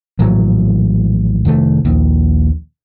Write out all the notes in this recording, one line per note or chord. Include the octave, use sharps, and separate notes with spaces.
A#1 A2 E3 F#3
F1 D#3 A3
A#1 D#2